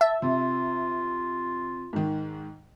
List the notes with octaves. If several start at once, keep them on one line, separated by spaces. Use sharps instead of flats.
E5 A5
C3 F4
G#2 D#3